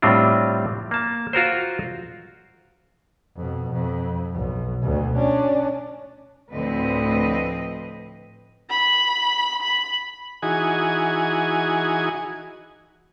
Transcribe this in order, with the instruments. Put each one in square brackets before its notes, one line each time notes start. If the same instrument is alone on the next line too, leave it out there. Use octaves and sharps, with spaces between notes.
[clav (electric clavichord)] A2 G3 C4 D4 F4
A#3 A5
F4 F#4 A#4 C5
[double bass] F2 B2
F2
B1
D2 B2
C#4 D4
[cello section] D2 A2 F3 C4 B4 D#5
[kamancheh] B5
B5
[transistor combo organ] E3 D#4 F#4 G#4 G#5